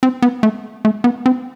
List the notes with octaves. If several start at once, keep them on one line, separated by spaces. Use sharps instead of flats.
C4
B3
A3
A3
B3
C4